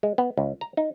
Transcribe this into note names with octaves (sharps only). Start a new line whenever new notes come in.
G#3
B3
C#2
A#5
D#4